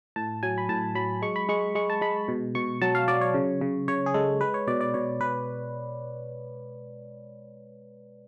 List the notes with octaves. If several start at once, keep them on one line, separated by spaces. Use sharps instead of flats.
A2 A5
F#3 G#5
B5
A2 A5
F#3 B5
G#3 C#6
B5
G#3 C#6
G#3 C#6
A5
G#3 B5
B2
B2 C#6
F#3 A5
F5
F#3 D5
C#5
C#3
C#3
C#3 C#5
G#4
G#3 A4
G#3 B4
C#5
B2 D5
D5
B2 C#5
B2 B4